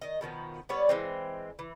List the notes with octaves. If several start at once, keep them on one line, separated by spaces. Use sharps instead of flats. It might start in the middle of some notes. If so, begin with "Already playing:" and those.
D#3 D#5
B2 D#3 F3 B3
G3 B3 C#5 D5
E3 G#3 C4
E3